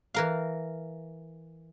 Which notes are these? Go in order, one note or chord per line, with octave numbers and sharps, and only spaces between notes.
E3 A#4 F5